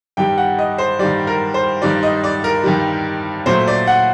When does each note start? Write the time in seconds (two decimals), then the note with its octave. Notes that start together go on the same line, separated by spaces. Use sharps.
0.17 G2 D#3 G3 G5
0.38 F#5
0.59 D#5
0.78 C5
0.99 G2 D#3 G3 D5
1.27 A#4
1.54 C5
1.82 G2 D#3 G3 D5
2.03 D#5
2.24 D5
2.44 A#4
2.64 G2 D#3 G3
3.46 A#2 F#3 A3 C5
3.68 D5
3.87 F#5